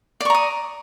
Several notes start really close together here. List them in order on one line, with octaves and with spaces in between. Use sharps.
D5 C#6 A#5 D#6